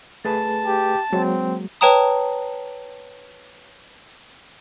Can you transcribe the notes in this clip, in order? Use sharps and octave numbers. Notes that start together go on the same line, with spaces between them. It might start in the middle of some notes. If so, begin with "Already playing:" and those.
A3 G#4 B4 A5
G4
F#3 G#3 A#3 C4
B4 C#5 G5 A5 A#5 D#6